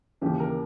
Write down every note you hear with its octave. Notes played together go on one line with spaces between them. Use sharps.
D#2 C#3 E3 G4
A#4